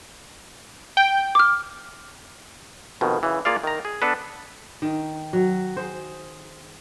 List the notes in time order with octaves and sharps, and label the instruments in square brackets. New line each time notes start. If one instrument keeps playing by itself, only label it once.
[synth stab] G5
[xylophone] D6 F6
[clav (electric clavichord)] F2 B2 D#3
C#3 E3
A#3 F4 G#4 D5 F5
D#3 A#5
G#4
B3 D4 A4 B4
[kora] D#3
F#3
G#4 C5